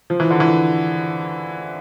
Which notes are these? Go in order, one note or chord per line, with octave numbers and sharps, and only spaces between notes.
F3
E3
D3
E3